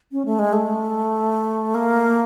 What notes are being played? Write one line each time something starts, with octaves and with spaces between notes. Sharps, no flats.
C#4
A3
G#3
A3
A#3